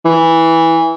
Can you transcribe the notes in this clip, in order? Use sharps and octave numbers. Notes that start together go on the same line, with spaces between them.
E3